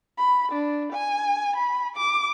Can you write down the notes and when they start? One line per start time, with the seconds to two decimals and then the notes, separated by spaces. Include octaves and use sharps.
0.18 B5
0.51 D4
0.92 G#5
1.56 B5
1.96 D6